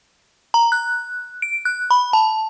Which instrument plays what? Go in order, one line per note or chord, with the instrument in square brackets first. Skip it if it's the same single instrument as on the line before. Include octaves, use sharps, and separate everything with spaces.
[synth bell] A#5
F#6
D7
F#6
B5
A5